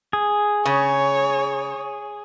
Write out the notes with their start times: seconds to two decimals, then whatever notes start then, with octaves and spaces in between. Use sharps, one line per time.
0.13 G#4
0.66 C#3 C#5